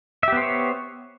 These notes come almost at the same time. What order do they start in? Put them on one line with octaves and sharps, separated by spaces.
E5 G4 B3 C5 C#5